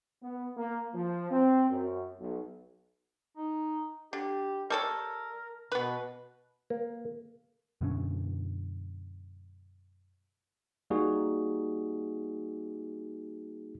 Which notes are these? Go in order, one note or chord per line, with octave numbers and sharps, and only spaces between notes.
B3
A#3
F3
C4
F#2
B1
D#4
D3 G4
G3 A4 A#4 C#5
B2 B3 B4
A#3
F#2 B2 D3 C#4
G3 A#3 D#4 F#4 G#4